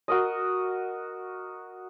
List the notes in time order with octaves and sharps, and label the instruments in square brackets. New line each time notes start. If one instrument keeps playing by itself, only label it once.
[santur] F#4 A#4 D#5